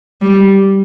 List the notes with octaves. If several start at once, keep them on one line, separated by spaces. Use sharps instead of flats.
G3